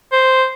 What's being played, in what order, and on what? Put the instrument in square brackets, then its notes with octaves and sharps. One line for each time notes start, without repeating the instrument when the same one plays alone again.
[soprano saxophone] C5